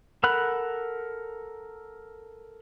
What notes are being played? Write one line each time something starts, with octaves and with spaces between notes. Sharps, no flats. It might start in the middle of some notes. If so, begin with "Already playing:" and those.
A4 A#4 F#5 B5 F#6